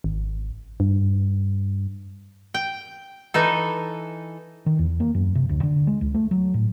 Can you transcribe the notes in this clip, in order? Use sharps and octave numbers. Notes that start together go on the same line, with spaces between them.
G#1
G2
G5
E3 D#4 A4
D#3
E2
A#3
F#2
C3
D2
D3
G#3
C#2
A3
F#3
A2